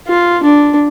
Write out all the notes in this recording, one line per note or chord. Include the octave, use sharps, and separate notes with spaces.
F4
D4